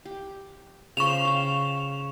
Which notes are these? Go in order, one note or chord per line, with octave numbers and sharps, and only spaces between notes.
G4
C#3 F4 C5 C#6 E7 F7
F5 G5